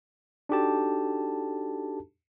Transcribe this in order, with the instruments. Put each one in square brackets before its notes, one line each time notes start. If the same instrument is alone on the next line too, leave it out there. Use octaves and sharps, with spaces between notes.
[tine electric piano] D4 D#4 F#4 G4 A4 A5